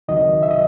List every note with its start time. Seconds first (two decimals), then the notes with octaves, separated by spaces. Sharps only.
0.08 C#2 C3 D#3 F#3 D#5
0.43 E5
0.51 D#5